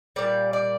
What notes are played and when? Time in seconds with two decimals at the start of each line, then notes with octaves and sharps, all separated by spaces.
0.16 A#2 G3 D5
0.53 D5